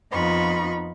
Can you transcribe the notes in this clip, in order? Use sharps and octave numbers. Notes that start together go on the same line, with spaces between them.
F2 B3 D#4 F4 B5 C#6